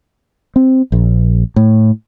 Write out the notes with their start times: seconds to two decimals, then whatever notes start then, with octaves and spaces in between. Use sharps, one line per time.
0.56 C4
0.92 A#1
1.56 A2